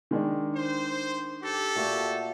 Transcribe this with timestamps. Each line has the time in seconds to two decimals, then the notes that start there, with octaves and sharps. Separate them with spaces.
0.11 D#3 G#3 D4
0.54 C5
1.42 G4 A4
1.75 A#2 A3 F#4